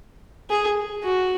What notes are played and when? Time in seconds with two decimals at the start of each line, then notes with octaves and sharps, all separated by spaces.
0.50 G#4
1.04 F#4